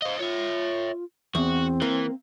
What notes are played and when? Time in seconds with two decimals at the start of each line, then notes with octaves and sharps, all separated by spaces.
0.02 C5 D#5 F5
0.19 F4 C#5 E5
1.35 E2 C4 F#4
1.82 E3 A#3